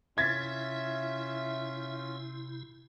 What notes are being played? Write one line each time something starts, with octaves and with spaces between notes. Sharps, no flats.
C3 C#4 E4 F4 E5 G#6 A6 B6